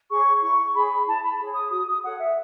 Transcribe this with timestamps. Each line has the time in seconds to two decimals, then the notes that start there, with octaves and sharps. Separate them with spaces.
0.10 G#4 C#5 C#6
0.42 E4 C#6
0.74 G#4 C#5 B5
1.07 E4 A5
1.23 B5
1.39 G#4 C#5
1.55 D#6
1.71 F#4 D#6
1.87 D#6
2.03 A4 C#5 F#5
2.19 E5